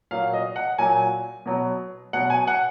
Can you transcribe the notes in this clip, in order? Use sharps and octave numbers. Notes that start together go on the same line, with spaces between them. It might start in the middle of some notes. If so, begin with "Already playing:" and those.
A#2 F#3 F5
D#5
F#5
A#2 F#3 G#5
B2 F#3
B2 F#3 F#5
G#5
F#5